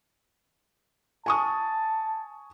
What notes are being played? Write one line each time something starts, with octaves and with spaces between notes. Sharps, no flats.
G#5 A5 C#6 D#6